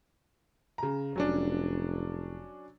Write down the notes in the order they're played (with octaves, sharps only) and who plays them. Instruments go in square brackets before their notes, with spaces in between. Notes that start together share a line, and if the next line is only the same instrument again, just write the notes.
[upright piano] C#3 A#5
[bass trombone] F1 [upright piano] F#3 C#4 D4